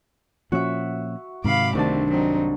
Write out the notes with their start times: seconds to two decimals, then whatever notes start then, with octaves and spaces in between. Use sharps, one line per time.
0.52 A#2 F3 C#4 F#4 E5
1.44 G#2 C3 D#3 F5 B5 D6
1.75 C2 G2 D#3 A3 C4 D4 A5
2.08 F#3 C4 D#4